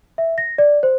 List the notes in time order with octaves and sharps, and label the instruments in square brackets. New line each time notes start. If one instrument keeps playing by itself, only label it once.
[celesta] E5
A#6
D5
C5